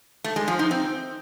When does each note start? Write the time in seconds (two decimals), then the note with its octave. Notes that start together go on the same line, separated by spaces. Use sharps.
0.24 A3
0.36 G#3
0.48 F3
0.59 D#4
0.71 C4